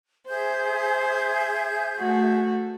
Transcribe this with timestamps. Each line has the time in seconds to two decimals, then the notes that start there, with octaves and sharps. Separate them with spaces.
0.28 G#4 C5 E5 G6
1.98 A3 F#4